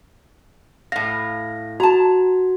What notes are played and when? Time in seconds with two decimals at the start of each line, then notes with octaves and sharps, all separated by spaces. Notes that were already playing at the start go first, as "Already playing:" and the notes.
0.92 A2 F5 A#6
1.80 F#4 A5 A#5